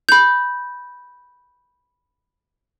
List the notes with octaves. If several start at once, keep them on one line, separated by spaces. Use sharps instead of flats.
B5 G6